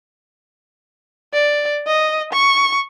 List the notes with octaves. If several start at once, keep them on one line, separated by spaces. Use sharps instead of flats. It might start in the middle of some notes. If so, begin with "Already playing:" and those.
D5
D#5
C#6